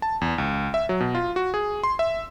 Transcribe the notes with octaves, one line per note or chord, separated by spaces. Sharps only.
A5
E2
C#2
E5
F#3
B2
F4
F#4
G#4
C6
E5